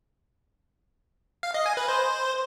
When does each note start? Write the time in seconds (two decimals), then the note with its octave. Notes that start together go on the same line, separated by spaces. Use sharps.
1.43 F5
1.54 D#5
1.66 G#5
1.77 B4
1.88 C5